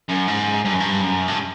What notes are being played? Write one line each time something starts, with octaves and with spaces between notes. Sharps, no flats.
F#2
G#2
G2
F#2
G2
F#2
G2